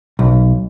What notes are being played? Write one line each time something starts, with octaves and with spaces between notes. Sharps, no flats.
B1